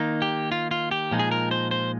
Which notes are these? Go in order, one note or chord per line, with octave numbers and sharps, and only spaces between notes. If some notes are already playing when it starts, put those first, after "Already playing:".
Already playing: D#3 A#3 D#4
G4
F4
F4
G4
A#2 F3 G#3 D#4
G#4
A#4
C5
C5